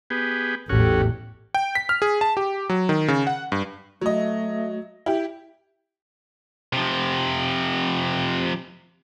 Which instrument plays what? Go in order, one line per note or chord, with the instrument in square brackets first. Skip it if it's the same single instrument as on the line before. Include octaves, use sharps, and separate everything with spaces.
[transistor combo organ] B3 G4 G#4
[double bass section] A1 E2 A2 [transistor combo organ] C#4 F#4 [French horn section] G4 A4
[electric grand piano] G5
B6
F6
G#4
A5
G4
F#3
D#3
C#3
F#5
G2
[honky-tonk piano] F#3 D#5 [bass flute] A3
[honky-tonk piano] E4 G4
[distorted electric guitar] C3 F3